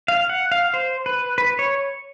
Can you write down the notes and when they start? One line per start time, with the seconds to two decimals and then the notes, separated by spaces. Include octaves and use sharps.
0.08 F5
0.29 F#5
0.52 F5
0.74 C5
1.06 B4
1.38 B4
1.59 C#5